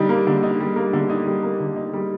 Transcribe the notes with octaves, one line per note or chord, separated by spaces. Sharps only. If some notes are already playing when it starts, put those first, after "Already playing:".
Already playing: D3 G3 D#4
A#3
D3
D#4
G3
A#3
D3
D#4
G3
A#3
D3
D#4
G3